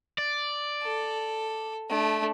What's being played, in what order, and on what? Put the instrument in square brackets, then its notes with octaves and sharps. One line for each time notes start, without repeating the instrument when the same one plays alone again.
[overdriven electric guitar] D5
[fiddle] A4
A3 D4